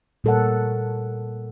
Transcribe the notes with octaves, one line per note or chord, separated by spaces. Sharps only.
A#2 G3 A4 A#4 C#5 F#5